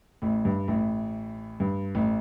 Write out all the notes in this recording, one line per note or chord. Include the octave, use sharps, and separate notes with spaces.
A1 A2
G2
A1 A2
G2
A1 A2